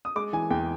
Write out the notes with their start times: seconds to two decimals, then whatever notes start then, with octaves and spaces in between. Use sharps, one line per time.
0.05 D#6
0.16 G#3 D6
0.33 E3 G#5
0.50 E2 G5